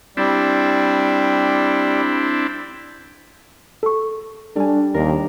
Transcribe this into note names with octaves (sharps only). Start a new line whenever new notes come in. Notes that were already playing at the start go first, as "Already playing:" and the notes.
G3 C4 D4 E4
A4 C#6
G3 D4 A4 G#5
D#2 D4 A#4